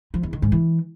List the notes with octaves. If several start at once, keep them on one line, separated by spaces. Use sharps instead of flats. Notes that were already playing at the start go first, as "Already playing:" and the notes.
F3
E2
D#3
G#2
E3